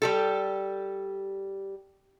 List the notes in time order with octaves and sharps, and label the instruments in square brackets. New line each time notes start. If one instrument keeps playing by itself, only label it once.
[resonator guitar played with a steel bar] G3 G4 A4